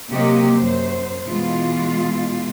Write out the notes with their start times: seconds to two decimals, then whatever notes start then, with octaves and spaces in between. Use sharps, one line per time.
0.12 C3 F#3 A#3 G4 D#5
0.56 F#2 C5
1.25 B2 E3 G#3 F4